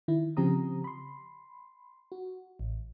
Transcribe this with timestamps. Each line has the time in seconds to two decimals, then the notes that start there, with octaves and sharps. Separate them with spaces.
0.08 D#3 E4
0.37 C#3 F3 C4 G4 A#5 D#6
0.84 B5 C6
2.12 F#4
2.59 A1